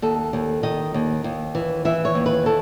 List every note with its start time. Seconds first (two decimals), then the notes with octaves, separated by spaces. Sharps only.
0.02 D#2 A4
0.33 D#2
0.63 D#3 D#5
0.94 D#2
1.24 D#2
1.55 E3
1.85 E3 E5
2.05 C#5
2.15 D#2
2.26 B4
2.46 E3 A4